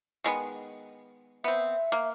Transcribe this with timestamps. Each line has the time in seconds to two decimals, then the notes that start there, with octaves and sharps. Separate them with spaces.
0.24 D#3 G#3 B3
1.44 B3 C4 E5
1.92 A#3